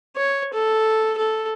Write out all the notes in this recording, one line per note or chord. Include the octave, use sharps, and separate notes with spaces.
C#5
A4
A4